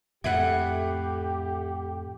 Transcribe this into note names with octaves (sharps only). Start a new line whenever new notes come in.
F2 A2 E4 G4 F#5